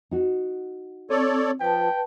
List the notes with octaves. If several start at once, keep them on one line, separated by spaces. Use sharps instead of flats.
D#4 F#4
C4 A4 C#5 D5
F3 B4 G5 A5